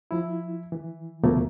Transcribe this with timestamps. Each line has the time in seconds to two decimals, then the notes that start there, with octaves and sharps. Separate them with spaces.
0.11 F3 E4
0.72 E3
1.24 D2 B2 F3 A3 A#3